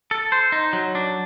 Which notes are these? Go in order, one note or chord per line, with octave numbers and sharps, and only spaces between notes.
A4
C5
D#4
F#3
D4